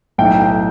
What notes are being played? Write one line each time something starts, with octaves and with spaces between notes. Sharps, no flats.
B1 A2 A3 G5
G5